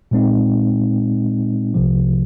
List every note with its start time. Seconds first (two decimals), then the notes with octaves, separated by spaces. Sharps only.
0.11 A#2 G#3 C4 D#4
1.74 C2 C3 F3